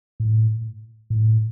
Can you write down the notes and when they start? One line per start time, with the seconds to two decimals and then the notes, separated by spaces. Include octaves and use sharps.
0.20 A2
1.10 A2